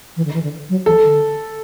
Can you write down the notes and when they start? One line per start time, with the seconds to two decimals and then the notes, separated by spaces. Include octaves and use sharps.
0.17 E3
0.25 D3
0.34 E3
0.43 D3
0.69 F#3
0.86 E3 A4
1.04 D3